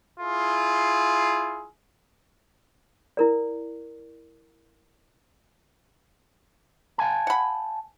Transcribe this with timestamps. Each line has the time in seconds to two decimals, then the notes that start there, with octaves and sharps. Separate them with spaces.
0.20 E4 F4 G#4
3.17 E4 A#4 D5
6.98 F5 G#5 A5
7.27 F#5 B5